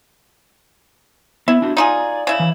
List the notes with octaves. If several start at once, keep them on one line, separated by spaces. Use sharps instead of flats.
B3 E4
D4 F#4 G4
D#4 F4 G#4 D5
C#3 E4
E3